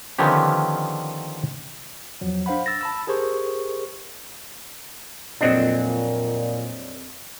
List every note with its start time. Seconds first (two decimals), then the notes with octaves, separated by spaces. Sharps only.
0.18 D3 D#3 F3 B3 C#4 G4
2.21 E2 F3 F#3
2.46 D4 C5 F5 F#5 B5
2.66 E6 A6 A#6
2.81 A5 B5 E6
3.07 G4 G#4 A#4 C5 C#6
5.41 F2 A#2 F#3 C4 D4 D#5